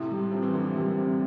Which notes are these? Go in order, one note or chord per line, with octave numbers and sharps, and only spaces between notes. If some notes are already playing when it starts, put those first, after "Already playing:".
Already playing: A2 C3 E4
G3
F3 C4
E3
D3 C4
C3
A#2 G3
C4